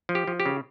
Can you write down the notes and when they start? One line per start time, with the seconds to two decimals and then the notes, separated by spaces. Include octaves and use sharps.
0.09 F3
0.15 G4
0.27 F3
0.40 G4
0.46 C#3